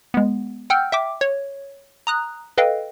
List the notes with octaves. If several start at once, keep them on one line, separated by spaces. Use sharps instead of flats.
G#3 B3
F#5 G5 E6 F6 G6
E5 G5 D6
C#5
A#5 D#6 F#6
A4 B4 D#5 F5 G5